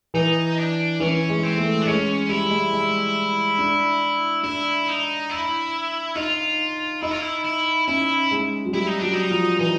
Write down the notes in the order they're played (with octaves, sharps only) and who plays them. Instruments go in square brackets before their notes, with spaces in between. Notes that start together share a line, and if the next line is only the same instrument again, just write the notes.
[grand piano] E3 [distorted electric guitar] D#4
[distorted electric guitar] D4
[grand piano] E3 [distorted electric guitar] C#4
[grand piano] G#3
[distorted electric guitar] C4
[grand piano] A3
[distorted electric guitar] D4
[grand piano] G#3 [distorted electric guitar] C#4
[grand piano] G3 [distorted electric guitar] E4
[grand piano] G#3
G#3
D4
[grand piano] D4 [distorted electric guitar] E4
[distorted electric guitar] D#4
E4
[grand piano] D#4 [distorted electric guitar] F4
[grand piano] D#4 [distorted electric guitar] E4
[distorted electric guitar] F4
E4
E4
[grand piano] C#4 [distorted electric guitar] E4
[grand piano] G#3
F#3
[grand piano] G3 [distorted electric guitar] E4
[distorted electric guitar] D#4
[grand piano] F#3 [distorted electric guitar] D4
[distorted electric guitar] D#4
[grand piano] F3
[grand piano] E3 [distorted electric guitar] D#4